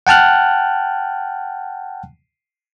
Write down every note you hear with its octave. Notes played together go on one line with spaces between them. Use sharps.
F#5 G5 A5 F6 F#6